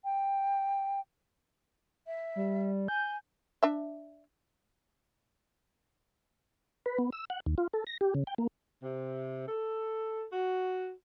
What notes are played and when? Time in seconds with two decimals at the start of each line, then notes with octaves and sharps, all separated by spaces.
0.05 G5
2.07 E5
2.36 G3
2.88 G#5 G6
3.63 D4 E5
6.86 B4
6.98 B3
7.13 E6
7.30 F#5
7.46 D#2
7.58 F4
7.73 A4
7.87 A#6
8.01 G4
8.15 C#3
8.27 G5
8.38 A#3
8.83 C3
9.49 A4
10.33 F#4